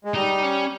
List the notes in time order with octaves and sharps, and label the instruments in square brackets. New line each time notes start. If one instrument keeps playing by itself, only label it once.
[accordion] G#3
[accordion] G3 [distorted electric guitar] D#4
[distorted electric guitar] C#4